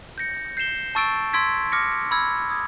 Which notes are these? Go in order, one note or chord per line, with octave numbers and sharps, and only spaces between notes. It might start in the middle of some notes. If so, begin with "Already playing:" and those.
G6 A#6 C#7
G6 C7 E7 G7
A5 C#6 E6 A6 D7
C6 E6 G#6 B6 D7
D6 F6 A#6 C#7
B5 E6 G#6
D#6 G#6